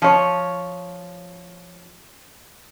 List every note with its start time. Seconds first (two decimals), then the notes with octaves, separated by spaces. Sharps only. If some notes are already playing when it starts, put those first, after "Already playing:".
0.02 F3 C#5